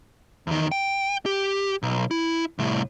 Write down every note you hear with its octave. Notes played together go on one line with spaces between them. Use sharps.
E2 D#3
G5
G4
B1
E4
C2 A2